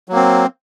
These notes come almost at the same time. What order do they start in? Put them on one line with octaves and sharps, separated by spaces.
F#3 A#3 C4